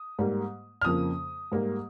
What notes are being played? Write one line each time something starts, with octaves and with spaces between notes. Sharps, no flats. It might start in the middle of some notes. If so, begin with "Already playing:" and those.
Already playing: D#6
G#2 G3 A#3
F6
F2 C#3 F3 A#3 D#6
G#2 G3 A#3